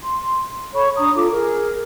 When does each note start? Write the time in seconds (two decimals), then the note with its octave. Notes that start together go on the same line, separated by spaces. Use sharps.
0.01 C6
0.74 A4 C#5 B5 C#6
0.97 D4 A#5 D#6
1.15 F4 A4 D6
1.31 G#4 A#4